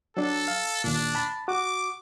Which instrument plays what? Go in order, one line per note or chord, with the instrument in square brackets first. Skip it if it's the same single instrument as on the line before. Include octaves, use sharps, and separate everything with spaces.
[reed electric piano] F#3 D4 [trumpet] A4
[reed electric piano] F5
[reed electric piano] D#2 A#2 [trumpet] D4
[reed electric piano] A5 B5
[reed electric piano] F#4 [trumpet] D6